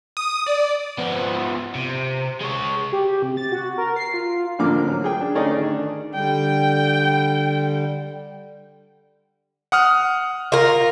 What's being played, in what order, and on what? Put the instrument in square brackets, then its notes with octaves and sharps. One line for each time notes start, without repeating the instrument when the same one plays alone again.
[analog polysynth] D#6
D5
[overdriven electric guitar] F3 B3
C3
G#3 C#5
[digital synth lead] G4
C3
A6
F#4
A#4
C7
F4
[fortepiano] A1 D3 F3 A#3 D6
F#3
G#4 G5
D4
D3 A3 C#4 D#4 G#4 D5
D#3 D4
[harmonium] D3 G3 [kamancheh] G5
[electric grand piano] F#5 D#6 F6
[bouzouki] F4 A#4